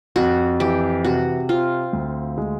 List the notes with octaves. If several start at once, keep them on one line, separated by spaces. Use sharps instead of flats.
F2 F#4
E3 G4
C3 F#4
C4 F4
D2
G#3